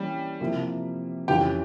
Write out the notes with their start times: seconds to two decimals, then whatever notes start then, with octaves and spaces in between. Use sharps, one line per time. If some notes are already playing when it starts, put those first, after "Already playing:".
Already playing: E3 G3 A#3 C#4
0.40 C3 F3 A#3 E4 A#4
1.28 F2 E3 G3 C#4 G4